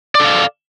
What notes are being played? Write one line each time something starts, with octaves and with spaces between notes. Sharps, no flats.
A4 D5 F5